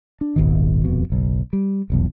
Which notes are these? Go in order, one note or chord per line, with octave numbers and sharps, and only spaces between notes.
D4
D#1 G#1 B2 D#3
D#1 F2 B2
F#1 B1
G3
F1 B1 E2